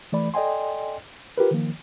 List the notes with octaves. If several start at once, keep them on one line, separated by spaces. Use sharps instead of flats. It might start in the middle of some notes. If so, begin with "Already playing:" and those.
E3 A3 D5 B5
A4 D5 D#5 G5 G#5 C6
F4 G4 A#4 B4
D#3 F3 A#3